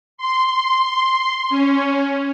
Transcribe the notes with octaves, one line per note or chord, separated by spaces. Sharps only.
C6
C#4